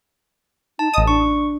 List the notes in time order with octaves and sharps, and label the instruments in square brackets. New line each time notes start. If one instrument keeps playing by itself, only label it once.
[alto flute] D#4 [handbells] A5
[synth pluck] A1 D#6 [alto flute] D#5
[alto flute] D4 [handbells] C#6